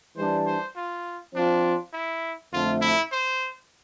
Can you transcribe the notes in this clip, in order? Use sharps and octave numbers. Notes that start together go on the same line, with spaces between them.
E3 G3 D4 C5
C5
F4
F3 C4 D4 F4
E4
F2 D3 A3 F4
E4
C5